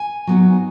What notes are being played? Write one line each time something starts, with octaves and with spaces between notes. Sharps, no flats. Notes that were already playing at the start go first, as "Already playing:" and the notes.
Already playing: G#5
F#3 B3 D#4